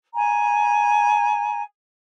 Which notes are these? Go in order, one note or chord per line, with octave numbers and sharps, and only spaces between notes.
G#5 A#5